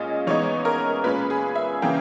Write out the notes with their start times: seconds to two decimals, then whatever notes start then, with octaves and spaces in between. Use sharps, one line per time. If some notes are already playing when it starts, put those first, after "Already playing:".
Already playing: A#2 G#3 C#4 D#5
0.27 E3 G#3 B3 D#4 C#5
0.65 A#4
1.04 A#2 G#3 C#4 B4
1.30 G#4
1.55 E5
1.82 C#3 E3 A#3 G5